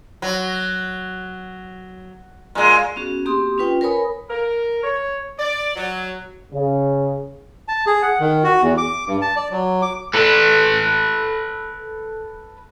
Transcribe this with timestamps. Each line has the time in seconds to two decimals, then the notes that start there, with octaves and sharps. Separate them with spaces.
0.22 F#3
2.55 A#2 G#3
2.96 B3 C#4 F#4 G#4
3.25 A#3 C4 G4 C6 D#6
3.58 C#4 F4 B4 G5
3.81 A#4 B4 C#5 G#5 B5 D#6
4.30 A#4
4.84 C#5
5.39 D5
5.76 F#3
6.53 C#3
7.68 A5
7.87 G#4
8.02 F#5
8.20 D#3
8.44 F#4
8.62 E2
8.77 D6
9.07 G2
9.22 A5
9.36 D5
9.51 F#3
9.82 D6
10.15 A4 B4